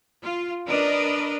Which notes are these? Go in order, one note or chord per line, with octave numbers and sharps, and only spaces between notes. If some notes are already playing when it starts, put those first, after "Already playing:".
F4
D4 A#4 B4 D5 D#5